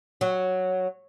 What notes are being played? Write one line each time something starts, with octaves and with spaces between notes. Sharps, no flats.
F#3